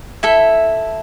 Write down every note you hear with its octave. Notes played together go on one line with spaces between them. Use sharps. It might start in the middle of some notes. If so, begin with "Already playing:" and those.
E4 A4 E5